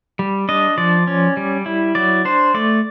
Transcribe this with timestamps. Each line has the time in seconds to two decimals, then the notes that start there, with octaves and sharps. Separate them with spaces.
0.19 G3
0.49 D4 D#5
0.78 F3 D5
1.07 C#4
1.37 G3
1.66 E4
1.95 F#3 D5
2.25 D4 C5
2.54 A3 D5